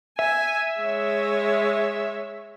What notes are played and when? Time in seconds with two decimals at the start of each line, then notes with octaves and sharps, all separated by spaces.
0.19 E5 G#5
0.80 G#3 C#5